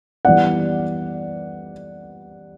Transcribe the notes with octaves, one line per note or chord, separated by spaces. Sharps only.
E3 G3 B3 D5 F#5